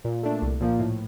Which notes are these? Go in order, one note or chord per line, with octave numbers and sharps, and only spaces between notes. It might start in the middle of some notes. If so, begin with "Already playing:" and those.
A#2
A3 D4
C2
A#2 F3 A#3
A2